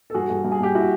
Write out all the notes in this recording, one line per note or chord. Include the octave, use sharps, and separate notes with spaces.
A4
G2 F#4 G#4
G2
G2
G#4
G2 G4
E4 F#4